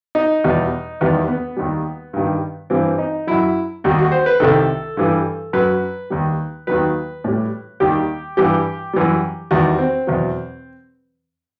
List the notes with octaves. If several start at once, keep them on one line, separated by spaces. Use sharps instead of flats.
D#4
E2 B2 G3
E2 D#3 G3 B3
B3
D#2 D#3 G3
G2 D#3 G3
G2 E3 G3 C4
D#4
F#2 F#3 E4
D#2 D#3 G3 F#4
F#4
C5
B4
C2 C3 D#3 A4
G2 E3 G3
F#2 F#3 B4
D#2 D#3 G3
D#2 D#3 F#3 B4
A2 G3
D#2 D#3 G3 G4
G2 E3 G3 G4
F#2 E3 G3
E2 D#3 G3 F#4
C4
E2 B2 F#3